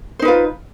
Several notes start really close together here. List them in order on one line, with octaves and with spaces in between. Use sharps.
C5 D#4 B4 F4